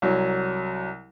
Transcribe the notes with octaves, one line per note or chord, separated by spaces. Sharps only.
C2 F#3